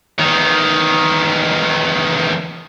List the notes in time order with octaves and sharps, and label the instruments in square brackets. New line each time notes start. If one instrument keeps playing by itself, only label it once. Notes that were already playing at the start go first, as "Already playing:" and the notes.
[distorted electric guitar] E2 D#3